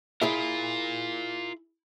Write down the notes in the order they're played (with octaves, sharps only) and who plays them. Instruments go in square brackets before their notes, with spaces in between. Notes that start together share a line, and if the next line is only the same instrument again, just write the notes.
[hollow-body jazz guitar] E4 G#4 E5 [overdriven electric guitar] F4 A#4